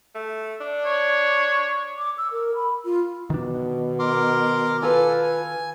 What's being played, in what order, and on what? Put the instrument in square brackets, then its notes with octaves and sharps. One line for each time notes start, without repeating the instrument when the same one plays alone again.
[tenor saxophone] A3
D4
[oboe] C#5
[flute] D6
E6
A#4
B5
F4
[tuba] B2 [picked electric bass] D#3 D4
[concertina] A#4 C6 D6
[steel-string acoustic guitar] F4 B4 [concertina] A4 G#5
[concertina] G#5